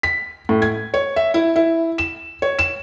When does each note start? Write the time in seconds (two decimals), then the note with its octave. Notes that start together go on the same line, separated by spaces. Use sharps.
0.03 B6
0.49 A2
0.62 G#6
0.94 C#5
1.16 E5
1.34 E4
1.56 E4
1.98 E7
2.42 C#5
2.59 E7